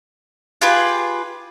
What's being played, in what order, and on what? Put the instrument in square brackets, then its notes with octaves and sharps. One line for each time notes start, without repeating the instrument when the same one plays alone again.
[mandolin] F4 G4 G#4 B4